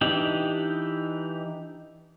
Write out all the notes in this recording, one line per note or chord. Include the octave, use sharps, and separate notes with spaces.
E3 D4 D#4 G4